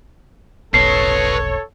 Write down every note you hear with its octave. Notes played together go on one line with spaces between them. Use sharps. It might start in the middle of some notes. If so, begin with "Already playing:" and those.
F1 B1 A4 B4 C#5 A5 C7